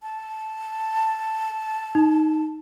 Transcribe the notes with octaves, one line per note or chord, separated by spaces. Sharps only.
A5
D#4